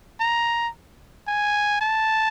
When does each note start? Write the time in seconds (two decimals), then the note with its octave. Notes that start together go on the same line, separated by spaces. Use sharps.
0.20 A#5
1.27 G#5
1.81 A5